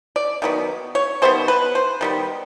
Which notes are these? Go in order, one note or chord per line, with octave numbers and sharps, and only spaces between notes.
D5
D#3 F#3 B3
C#5
D#3 G3 B3 C5
B4
C5
D#3 G3 B3